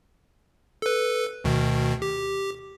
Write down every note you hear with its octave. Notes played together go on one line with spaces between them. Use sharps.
A4 B4
D2 B2 D#3
G4